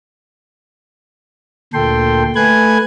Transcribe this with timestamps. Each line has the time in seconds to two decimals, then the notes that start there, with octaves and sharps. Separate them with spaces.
1.74 D2 A#2 A4 G5 C6
2.36 A3 B4 G#5 F#6 G#6